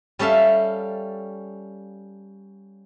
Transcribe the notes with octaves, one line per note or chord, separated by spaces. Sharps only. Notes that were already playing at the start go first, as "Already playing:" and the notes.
G3 C#4 A4 E5 F5